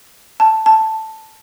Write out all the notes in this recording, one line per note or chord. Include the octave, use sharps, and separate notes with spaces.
A5
A5